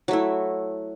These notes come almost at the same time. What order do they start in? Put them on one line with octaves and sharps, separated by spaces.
F#3 A3 E4